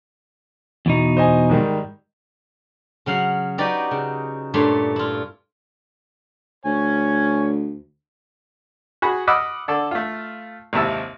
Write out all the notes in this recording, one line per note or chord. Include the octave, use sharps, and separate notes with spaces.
E2 B2 D#4
C5 D#5 G#5
G#2 D#3 G3
C#3 F#3 F5 F#5
D#4 F#4 G4 B4 D5 D#5
C#3
G2 A#2 A3 C#5 C6
E4 F4
D2 C#5 G#5
F#4 G#4 B5
D#5 F#5 B5 D6 E6 F6
D3 A4 D5
A3 F4
G#1 D#2 C3 E4 A5 E6